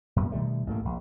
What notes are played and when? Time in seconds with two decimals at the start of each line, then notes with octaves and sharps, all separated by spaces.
0.16 F#2 A#2 G3 B3
0.32 B2 D#3 G3 A3
0.67 A1 G#2 A3 A#3
0.85 A#1